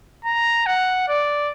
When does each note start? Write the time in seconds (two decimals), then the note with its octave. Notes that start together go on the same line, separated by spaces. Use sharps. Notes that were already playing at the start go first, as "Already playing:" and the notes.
0.25 A#5
0.66 F#5
1.08 D5